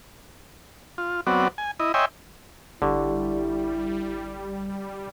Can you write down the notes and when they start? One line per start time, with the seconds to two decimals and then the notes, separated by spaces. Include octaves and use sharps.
0.98 F4
1.27 F#3 B3 C4 F#4 D5
1.58 G#5
1.80 E4 D#5
1.94 C#5 D#5 E5 G5 G#5 C6
2.82 G#1 D3 G3 E4 G4 C#6